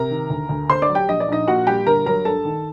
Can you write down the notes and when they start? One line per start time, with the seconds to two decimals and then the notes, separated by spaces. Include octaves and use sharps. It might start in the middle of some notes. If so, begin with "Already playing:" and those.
Already playing: C3 A#4 A#5
0.11 D#3
0.30 D2
0.49 D2
0.69 D3 C5 C6
0.82 D5 D6
0.89 F#3
0.95 G4 G5
1.08 A#1 D#5
1.20 D5
1.28 A#1 D#4 D#5
1.47 A#2 F#4 F#5
1.67 G3 G4 G5
1.86 G1 A#4 A#5
2.06 F#3 A#4 A#5
2.25 G2 A4 A5
2.45 D#3